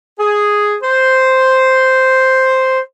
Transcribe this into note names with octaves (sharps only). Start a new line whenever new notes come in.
G#4
C5